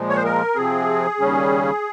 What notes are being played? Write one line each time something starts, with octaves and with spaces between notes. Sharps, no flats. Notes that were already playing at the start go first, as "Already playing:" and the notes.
Already playing: A#2 F3 G#3
C#5
C5
A#4
C3 F3 C4 G#4
D#2 C#3 G3 C#4